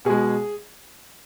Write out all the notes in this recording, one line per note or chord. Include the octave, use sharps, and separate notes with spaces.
B2 G#3 G#4